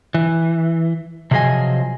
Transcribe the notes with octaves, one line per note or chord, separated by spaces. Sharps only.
E3
C3 F3 F#3 G#4 D#5 G#5